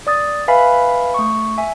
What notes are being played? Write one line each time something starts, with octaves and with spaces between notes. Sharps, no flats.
D5 D#6 A6
B4 E5 F5 G#5 B5
A3 C#6
E5 G#5